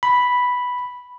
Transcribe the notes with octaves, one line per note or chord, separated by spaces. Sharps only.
B5